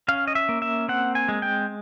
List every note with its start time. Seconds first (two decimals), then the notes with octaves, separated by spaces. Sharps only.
0.08 C#4 F5
0.27 D#5
0.35 E5
0.49 A#3
0.62 E5
0.88 C4 F#5
1.15 G#5
1.29 G#3
1.42 G5